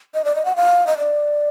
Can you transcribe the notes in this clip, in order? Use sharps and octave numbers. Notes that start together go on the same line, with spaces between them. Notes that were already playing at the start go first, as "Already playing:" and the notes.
D#5
D5
D#5
F#5
F5
D#5
D5